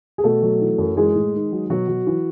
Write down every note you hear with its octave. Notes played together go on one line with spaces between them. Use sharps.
G#4
B2 A3 A4
F#3
E3
F#2
E3 G#3 G#4
A2
D#3
F#3
B2 F#3 F#4
F#3
E3